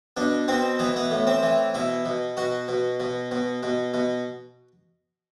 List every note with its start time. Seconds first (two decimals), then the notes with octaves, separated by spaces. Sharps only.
0.17 B2 D4
0.48 B2 C4
0.79 E3 B3
0.96 B3
1.11 A2
1.27 C4
1.43 E3
1.74 B2 E4
2.05 B2
2.37 B2 F#4
2.68 B2
3.00 B2
3.31 B2
3.63 B2
3.94 B2